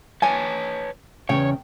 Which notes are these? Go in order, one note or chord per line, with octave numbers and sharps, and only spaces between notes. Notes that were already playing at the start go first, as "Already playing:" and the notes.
B4 C#5 G#5 A5
E2 C#3 C#5 G5